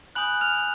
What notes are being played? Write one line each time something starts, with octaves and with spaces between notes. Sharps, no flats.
G#5 B5 D#6 F#6 G6 F#7
F6 F7